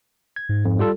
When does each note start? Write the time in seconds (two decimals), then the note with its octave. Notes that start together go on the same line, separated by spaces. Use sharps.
0.36 G#6
0.49 G#2
0.65 F2
0.79 G3 F4 A4